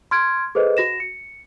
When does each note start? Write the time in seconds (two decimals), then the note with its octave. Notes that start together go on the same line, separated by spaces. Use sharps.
0.11 C6 F6 G#6 D7
0.55 G#4 A4 B4 C5 D#5
0.77 F#4 A#6 E7
1.00 C#7